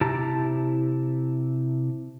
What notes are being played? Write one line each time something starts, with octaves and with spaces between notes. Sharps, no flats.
C3 E4 G4 A5 A#5